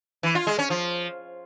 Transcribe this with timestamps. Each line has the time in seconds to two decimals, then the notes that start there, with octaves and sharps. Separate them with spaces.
0.23 E3
0.35 F4
0.47 G#3
0.59 C#4
0.70 F3